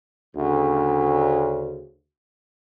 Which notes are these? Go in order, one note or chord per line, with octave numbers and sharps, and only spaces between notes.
D2 C#3